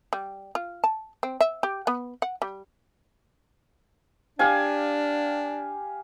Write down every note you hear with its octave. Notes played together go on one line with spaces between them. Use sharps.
G3
F4
A5
C4
E5
G4
B3
F#5
G3
D4 G4 F5 G#5